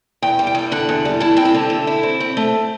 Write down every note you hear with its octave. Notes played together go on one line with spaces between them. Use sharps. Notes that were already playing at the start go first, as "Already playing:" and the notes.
E2 G5
G3
G5
E2
D3 F#5
E2
G3
E4 A5
C4 G5
A5
D3
A3
E4
C4
C4
A3